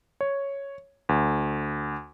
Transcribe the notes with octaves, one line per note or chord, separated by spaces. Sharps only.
C#5
D2